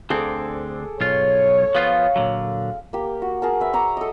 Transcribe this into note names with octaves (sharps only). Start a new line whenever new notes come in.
D2 D3 C4 G#4 A4 D6
B1 F4 C#5
F3 B3 F4 F5
A#2 D3 F#3
A#3 G4
F#4
G#4 A#4 A5
B4 E5
A#5 C#6 D6
A4 D#5